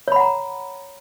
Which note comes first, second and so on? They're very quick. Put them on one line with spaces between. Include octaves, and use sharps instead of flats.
C#5 B5 F#5 A#5